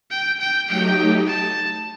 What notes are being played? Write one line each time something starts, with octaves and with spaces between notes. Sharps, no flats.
G5
G5
F#3 A3 D#4 G4 D#5 G5
A5